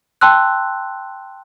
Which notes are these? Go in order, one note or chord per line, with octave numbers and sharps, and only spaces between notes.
G5 A5 C6 E6 F#6